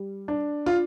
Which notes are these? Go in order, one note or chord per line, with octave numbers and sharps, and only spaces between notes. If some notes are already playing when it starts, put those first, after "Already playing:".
Already playing: G3
D4
F4